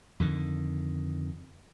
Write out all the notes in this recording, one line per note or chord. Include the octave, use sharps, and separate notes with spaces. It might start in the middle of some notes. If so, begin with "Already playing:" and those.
F2 D3 D#3